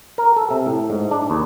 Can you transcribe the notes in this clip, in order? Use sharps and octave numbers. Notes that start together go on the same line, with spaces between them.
A#4
A4
C3
A2
G#2
D4
D#2